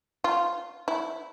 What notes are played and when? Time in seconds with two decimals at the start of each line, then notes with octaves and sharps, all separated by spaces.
0.24 F4
0.88 E4